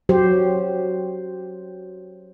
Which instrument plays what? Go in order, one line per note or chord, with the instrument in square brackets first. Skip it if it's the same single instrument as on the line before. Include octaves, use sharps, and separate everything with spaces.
[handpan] F#3 G4 C5